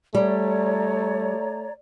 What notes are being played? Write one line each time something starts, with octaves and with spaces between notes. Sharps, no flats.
G3 A3 C#5 D5 A#5